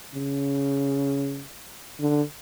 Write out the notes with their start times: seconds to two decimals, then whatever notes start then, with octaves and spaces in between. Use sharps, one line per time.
0.14 C#3
2.00 D3